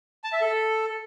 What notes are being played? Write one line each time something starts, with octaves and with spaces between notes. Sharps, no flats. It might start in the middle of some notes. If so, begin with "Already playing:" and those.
A5
E5
A4